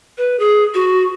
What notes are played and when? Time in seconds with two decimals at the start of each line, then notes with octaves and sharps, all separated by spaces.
0.18 B4
0.39 G#4
0.74 F#4